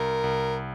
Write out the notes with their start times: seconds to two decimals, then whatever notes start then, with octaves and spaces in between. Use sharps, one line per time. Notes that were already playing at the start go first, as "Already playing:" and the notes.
Already playing: C2 A#4
0.24 C2